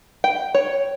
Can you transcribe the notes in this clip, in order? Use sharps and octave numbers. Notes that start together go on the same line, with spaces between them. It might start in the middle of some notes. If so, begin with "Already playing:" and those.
G5
C#5